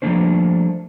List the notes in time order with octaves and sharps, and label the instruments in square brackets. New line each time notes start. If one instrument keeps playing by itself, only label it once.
[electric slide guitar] F3 G3 A3 A#3 D4 C5